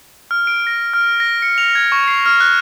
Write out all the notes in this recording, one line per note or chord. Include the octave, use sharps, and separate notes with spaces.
F6
D7
A#6
F6
A#6
C#7
F7
G#6
C#6
C7
F6
F#6